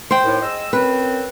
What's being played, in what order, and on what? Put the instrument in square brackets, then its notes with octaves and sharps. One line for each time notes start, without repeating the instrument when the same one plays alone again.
[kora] C5 G5
[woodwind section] D#2 A2
G#3 D#5 E6
[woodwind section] F#2 C4 [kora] B4